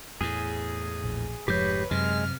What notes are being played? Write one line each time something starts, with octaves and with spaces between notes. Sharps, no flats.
E2 A2 G#4
A#1
F1 G#2 F3 G#3 G4 B4 C#5 G6
F#2 C3 G#3 F6